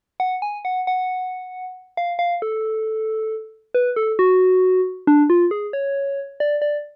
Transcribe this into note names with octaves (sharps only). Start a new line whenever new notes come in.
F#5
G#5
F#5
F#5
F5
F5
A4
B4
A4
F#4
D4
F4
G#4
C#5
D5
D5